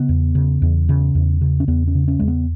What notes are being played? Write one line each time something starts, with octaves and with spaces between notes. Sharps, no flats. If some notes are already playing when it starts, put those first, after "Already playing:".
Already playing: C#3 B3
E2
C#3
E2
C#3
E2
C#3
C#4
E2 B3
C#4
C#3
C#4
E2 G#3
B3